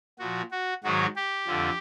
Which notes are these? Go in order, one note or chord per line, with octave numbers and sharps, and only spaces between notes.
A#2 F3 F#4
F#4
G#2 D#3 F#3 F#4
G4
F2 D3 F3